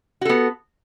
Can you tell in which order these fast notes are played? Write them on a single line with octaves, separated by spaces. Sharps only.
F#4 A4 B3